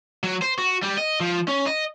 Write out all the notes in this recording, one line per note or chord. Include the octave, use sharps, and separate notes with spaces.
F#3
C5
F#4
G3
D#5
F3
C#4
D#5